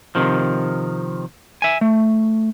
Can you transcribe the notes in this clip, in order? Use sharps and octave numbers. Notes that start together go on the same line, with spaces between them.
C3 D#3 F3
E5 G#5
A3